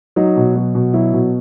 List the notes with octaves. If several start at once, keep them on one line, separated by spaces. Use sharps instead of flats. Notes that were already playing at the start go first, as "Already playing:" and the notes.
F#3 D#4
B2
F#3
B2
F#3 E4
B2